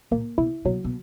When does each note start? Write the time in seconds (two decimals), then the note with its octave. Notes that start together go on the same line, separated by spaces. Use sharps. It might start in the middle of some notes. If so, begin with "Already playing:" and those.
0.11 A#2 A#3
0.38 B2 E4
0.65 B2 F#3
0.84 B2